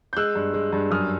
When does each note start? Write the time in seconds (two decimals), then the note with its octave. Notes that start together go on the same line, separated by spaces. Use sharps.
0.13 G6
0.17 G#3 E6 F#6
0.35 G2
0.54 G#3
0.73 G2
0.91 F#2 D#6 F6